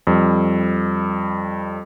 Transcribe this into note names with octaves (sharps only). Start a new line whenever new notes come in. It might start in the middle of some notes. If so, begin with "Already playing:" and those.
F2 G3